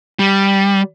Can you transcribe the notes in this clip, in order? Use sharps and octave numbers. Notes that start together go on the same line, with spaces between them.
G3